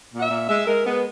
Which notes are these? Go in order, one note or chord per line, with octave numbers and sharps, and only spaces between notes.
A#2 F#5
E5
A#2
G#3 E5
G#3 A#4
G#3 B3